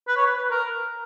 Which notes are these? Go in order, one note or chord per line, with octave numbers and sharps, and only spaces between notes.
B4
C#5
B4
B4
A#4